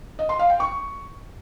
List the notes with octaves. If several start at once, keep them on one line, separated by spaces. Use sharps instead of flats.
D#5
C6
F5
G5
C#6